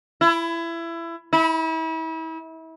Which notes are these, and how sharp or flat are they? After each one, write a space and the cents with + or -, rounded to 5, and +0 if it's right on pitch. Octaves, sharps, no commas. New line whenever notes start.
E4 +25
E4 -35